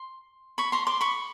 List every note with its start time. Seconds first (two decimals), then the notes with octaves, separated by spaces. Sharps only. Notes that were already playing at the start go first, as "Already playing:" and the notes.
Already playing: C6
0.58 B5 C#6
0.72 A#5 C6
0.87 C6 D6
1.01 B5 C#6